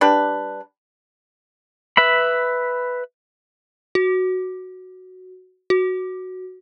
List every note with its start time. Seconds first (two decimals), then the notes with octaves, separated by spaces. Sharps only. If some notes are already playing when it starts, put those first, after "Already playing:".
0.01 G3 D4 B4
1.97 B4 E5 B5
3.95 F#4
5.70 F#4